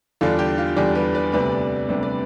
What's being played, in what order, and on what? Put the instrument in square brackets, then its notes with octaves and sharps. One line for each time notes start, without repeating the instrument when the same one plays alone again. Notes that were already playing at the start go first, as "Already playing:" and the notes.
[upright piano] E2 D3 G3 D4 F4 A4
G4
F4
E2 D3 G3 D4 G4
G4 B4
B4 D5
D2 C3 G3 B3 D4 B4 D5
D2 C3 G3 B3 D4
B4 D5